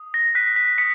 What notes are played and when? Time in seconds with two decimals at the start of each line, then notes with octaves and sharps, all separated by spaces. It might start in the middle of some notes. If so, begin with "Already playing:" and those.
Already playing: D#6
0.14 A#6
0.35 F#6 B6
0.56 B6
0.78 D#6 B6 C#7